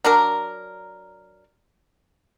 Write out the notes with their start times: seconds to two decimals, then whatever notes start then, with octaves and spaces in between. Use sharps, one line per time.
0.04 F#3 D4 A#4